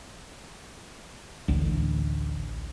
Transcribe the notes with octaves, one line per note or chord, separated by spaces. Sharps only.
A1 D2